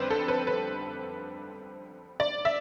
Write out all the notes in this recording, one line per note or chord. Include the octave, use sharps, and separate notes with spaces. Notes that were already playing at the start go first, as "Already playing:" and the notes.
Already playing: F2 D3 G3 C4 B4 C5
A4
B4
B4
D5
E5